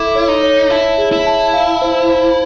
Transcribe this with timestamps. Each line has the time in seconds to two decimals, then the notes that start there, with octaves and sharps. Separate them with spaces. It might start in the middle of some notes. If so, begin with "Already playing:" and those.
Already playing: E4 A4 D6
0.15 C#5
0.28 D#4
0.43 C#5
0.70 E4 A5
0.98 G#4
1.12 E4
1.27 A5
1.53 F5
1.82 C5
2.09 C5